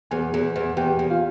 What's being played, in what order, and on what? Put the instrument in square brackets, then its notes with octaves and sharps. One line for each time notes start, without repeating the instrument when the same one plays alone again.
[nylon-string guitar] E2 [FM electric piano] G#4 G#5
[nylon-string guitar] E2
E2
[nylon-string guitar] E2 [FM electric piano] G4 G5
[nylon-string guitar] E2
[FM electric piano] F4 F5